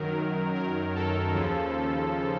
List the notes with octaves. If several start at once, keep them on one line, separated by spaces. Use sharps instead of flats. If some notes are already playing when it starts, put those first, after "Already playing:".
Already playing: F#2 D#3 F#3 A#4
A#4
A4
D#2 C#3 F3